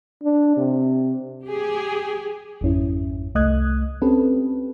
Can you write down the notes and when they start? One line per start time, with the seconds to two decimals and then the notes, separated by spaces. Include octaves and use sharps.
0.23 D4
0.57 C3
1.45 G4 G#4
2.61 G#1 F2 C#4 E4
3.35 C2 A3 D#5 D#6 F#6 G#6
4.02 C4 C#4 G4 A4 B4